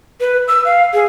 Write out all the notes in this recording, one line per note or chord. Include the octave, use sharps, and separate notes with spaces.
B4
E6
F5
G#4